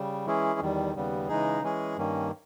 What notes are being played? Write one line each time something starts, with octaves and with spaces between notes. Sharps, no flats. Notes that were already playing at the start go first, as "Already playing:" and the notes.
Already playing: C#3 G3
E3 G#3 C#4 E4 G#4
E2 D#3 G3
D#2 C#3 G3 B3
C#3 E3 G#3 D#4 G#4
E3 G#3 C#4 G#4
G2 D#3 A#3 C#4